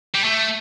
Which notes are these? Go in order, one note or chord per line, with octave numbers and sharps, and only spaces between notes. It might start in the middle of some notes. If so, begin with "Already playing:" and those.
G3
A3